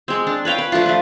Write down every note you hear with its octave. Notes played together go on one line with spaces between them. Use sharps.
G#3 C4
D4
B4 C#5 F5 G5
B4
F3 A3 D4 F4
A3 B4